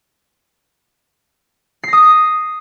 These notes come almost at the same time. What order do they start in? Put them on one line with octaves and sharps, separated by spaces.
C7 A#6 D#6